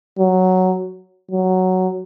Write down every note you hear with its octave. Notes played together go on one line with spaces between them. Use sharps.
F#3
F#3